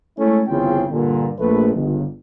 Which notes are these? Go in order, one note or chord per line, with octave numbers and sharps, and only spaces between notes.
G#3 A3 C#4 E4
G1 E2 C#3 C4 F4 G5
G2 A#2 D3
A#1 A3 B4
G1 C#2